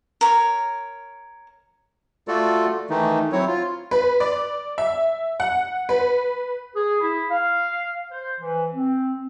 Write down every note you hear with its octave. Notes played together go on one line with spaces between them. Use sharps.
A#4 C#5
A3 F4 F#4 A4 D5
D#3 E3 A3 D#4
F#3 C4 E4 C#5
F4
B4
D5
E5
F#5
B4
G#4
E4
F5
C5
E3
C4